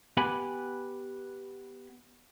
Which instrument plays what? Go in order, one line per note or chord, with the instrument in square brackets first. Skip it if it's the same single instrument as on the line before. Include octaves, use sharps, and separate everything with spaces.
[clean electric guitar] B3 G4 B4 G#5 B5